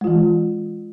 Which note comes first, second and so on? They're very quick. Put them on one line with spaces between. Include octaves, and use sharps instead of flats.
G#3 F4 E3